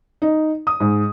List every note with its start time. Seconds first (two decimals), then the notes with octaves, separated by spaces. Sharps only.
0.22 D#4
0.67 D#6
0.80 G#2